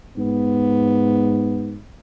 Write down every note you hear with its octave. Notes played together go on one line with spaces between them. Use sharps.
G#2 B3